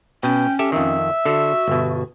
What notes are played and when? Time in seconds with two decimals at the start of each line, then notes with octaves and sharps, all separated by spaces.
0.23 B2 C#4 G5
0.59 G4 A4 E5
0.72 F2 D#3 E5
1.25 D3 F#4 A4
1.68 G1 B2